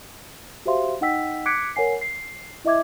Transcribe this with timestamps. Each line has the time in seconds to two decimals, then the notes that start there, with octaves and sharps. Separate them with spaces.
0.65 F#4 G4 C5 E5 F5 C6
1.01 D#4 D#5 F#5 G5 E6 B6
1.46 D6 F#6 G#6 B6 C#7 D7
1.76 A#4 C#5 F#5 G#5 C7
2.01 C7
2.65 E4 D#5 E5 D6 G#6